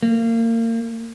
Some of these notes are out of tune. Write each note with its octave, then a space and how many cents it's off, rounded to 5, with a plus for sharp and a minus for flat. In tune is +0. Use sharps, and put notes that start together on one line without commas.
A#3 -30